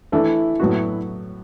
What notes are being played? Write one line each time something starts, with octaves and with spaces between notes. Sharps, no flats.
E3 A3 D4 E4 A4
A2 F#3 B3 F#4